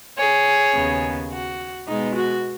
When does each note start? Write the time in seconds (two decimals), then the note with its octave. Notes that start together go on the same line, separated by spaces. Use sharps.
0.18 G#4 C#5
0.74 D#2 C#3 B3
1.31 F#4
1.87 B2 G#3 B3 D#4
2.16 F#4